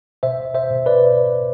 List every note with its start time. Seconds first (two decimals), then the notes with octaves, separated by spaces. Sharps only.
0.23 B2 C5 E5
0.54 C5 E5
0.71 B2
0.86 B4 D5